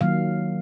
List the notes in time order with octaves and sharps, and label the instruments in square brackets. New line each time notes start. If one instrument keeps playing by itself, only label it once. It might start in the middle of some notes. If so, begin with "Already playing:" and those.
[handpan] D#3 F#3 A#3 F5